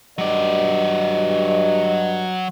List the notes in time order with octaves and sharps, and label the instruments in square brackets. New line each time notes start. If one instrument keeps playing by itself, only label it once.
[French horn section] G2 D#5 [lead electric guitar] F#3 D5